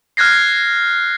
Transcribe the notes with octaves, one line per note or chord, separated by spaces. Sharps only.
F6 F#6 G#6 A#6 C7